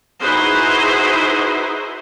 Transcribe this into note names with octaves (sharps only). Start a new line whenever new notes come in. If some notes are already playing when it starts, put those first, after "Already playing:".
D#4 E4 F#4 G#4 B4 C5